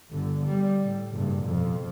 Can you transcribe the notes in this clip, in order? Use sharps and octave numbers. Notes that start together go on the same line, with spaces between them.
G1 D3
G3
A2
F#1 G2
F2 B2